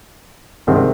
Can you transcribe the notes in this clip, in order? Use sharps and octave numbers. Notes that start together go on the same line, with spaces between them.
C2 C3 D#3 G#3 C4